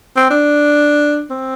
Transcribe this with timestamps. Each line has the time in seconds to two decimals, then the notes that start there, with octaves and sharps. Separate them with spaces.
0.16 C4
0.30 D4
1.30 C4